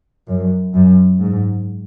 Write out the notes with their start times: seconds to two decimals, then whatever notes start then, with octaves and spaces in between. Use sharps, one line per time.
0.28 F#2
0.74 F#2
1.20 G#2